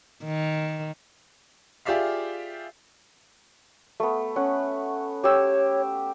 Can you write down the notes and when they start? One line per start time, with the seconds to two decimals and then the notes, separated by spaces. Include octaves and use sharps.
0.25 D#3
1.85 F4 G4 G#4 D5 E5 F5
4.00 A3 B3
4.36 C#4 F#5
5.24 G4 C#5 E6